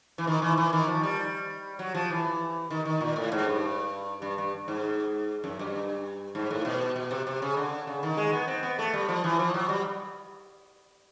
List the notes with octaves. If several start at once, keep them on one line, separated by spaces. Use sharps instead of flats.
E3
D#3
E3
E3
D#3
F3
G3
F#3
F3
E3
D#3
D#3
A#2
A2
G#2
G2
G2
G2
G#2
F#2
G2
G#2
A2
B2
B2
C3
C3
C#3
D3
C#3
D#3
G#3
B3
C4
B3
A3
G3
F3
E3
F3
F#3
G3